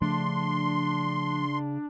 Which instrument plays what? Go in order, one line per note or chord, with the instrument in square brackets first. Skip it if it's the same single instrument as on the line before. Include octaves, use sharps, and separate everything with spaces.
[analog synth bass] C#3 [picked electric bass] F3 A3 [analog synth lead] D4 [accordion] C6